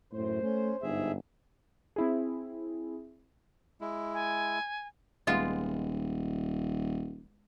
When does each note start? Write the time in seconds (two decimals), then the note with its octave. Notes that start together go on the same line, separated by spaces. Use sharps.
0.12 F#2 A2 C5
0.42 A3 C#4
0.82 G1 G#2 G#4 E5
1.96 C4 E4 G#4
3.81 G#3 E4
4.14 G#5
5.27 D#1 G#3 B3 F4